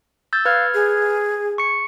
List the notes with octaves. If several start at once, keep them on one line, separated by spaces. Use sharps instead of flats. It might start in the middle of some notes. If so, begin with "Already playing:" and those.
E6 G6 A6
B4 F5 F6 G#6
G#4
C#6 C#7